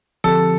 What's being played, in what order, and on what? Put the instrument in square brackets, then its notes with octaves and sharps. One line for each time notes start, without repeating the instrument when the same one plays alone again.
[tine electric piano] D3 F3 C4 G4 [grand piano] A4